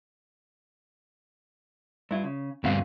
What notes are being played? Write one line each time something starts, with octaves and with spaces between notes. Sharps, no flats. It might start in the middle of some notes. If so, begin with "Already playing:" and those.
G2 E4 F4
C#3
D2 G2 B2 C4 F5